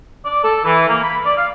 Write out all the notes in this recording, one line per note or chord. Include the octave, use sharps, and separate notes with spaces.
D5
A4
E3
A#3
B5
D5
F5